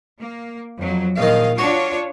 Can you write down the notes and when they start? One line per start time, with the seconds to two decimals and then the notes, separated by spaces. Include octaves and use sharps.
0.20 A#3
0.79 F2 F#3
1.18 A#1 D#3 D#5 F5
1.58 D4 F4 F#4 C#5